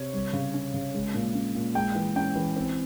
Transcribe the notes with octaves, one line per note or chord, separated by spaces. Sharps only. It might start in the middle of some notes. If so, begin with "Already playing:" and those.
Already playing: C3 C#5
G3
C#3
C#4
C#3
G#3
A#2
C#4
A#2
G#3 G5
E3
C#4 G5
E3
C4